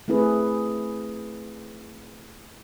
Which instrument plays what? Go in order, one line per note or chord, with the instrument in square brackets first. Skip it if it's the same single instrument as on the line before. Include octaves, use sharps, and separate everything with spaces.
[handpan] A3 C4 E4 G#4 B4